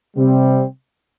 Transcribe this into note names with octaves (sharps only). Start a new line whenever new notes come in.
C3 G3 C4